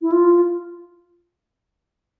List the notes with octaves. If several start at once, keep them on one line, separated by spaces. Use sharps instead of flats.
E4
F4